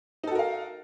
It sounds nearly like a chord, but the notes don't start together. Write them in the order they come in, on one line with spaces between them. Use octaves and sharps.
D#4 A4 F#4 A#4 F5